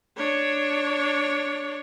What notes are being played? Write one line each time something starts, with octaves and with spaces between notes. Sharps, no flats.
D4 C#5